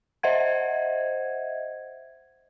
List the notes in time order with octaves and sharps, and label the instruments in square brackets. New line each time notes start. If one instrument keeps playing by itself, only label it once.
[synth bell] C5 D#5 E5 F#5 G#6